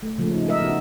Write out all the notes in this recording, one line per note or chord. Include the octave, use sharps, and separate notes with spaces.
A3
C#3 F3 G#3 A3
C#4 D#4
G#3 A#4 D#5 E5
C#3 B3 D#4 F#4